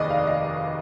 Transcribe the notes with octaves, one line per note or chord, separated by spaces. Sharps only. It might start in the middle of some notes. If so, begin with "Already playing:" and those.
Already playing: F1 D#2 D#3 G#4 B4 D5 D#5
F5
D#5